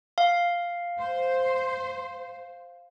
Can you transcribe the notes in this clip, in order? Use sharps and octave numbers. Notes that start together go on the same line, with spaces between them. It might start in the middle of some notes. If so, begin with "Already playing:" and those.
F5
C5